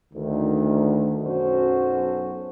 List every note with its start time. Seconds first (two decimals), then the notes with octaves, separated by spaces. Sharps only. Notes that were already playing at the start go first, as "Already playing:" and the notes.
0.13 D2 D#3
1.24 B1 F#2 C#4 F#4 A4 C5